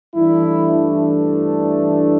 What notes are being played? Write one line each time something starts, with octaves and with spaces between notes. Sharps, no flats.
G2 E3 A3 D4 E4